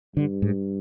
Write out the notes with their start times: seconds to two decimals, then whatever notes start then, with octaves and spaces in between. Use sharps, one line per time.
0.16 G2 D3
0.42 G#2